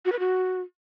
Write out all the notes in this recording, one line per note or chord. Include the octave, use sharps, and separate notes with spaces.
F#4
B4
F#4